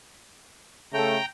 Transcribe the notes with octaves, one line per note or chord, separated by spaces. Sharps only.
C#3 A3 G5 A#5